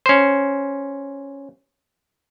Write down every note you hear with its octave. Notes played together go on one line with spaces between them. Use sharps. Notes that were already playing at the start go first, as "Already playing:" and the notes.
C#4 C5